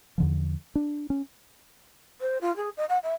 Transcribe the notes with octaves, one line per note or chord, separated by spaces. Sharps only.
E2 D3 F3
D4
C#4
C5
F4
G#4
D#5
F#5
E5